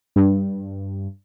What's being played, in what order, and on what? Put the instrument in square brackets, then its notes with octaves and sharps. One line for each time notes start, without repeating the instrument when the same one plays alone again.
[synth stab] G2